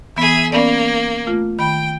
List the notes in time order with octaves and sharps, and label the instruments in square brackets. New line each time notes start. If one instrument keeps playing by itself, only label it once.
[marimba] E3 B3 [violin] G#4 E5
[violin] A#3 [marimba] B3 C#4 D5
[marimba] A3 F4
[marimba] D#3 B5 [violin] G5